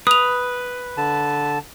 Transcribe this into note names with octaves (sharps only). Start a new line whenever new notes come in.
B4 D#6 F7
D3 A5